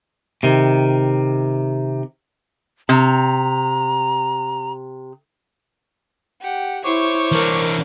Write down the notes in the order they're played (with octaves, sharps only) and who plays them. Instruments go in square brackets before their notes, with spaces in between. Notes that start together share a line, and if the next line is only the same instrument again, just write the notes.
[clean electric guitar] C3 D#3
[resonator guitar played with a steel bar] C3 [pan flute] A#5
[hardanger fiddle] G4 F#5
[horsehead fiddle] E4 [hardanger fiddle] C5 C#5 [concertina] C#6 D6
[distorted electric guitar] E3 D4 [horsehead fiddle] A#4